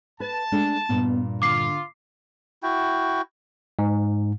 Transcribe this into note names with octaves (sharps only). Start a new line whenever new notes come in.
B4 A5
G#3 A3 D4
G2 A#2 B3
D3 F4 D6 C7
E4 F#4 G5
G#2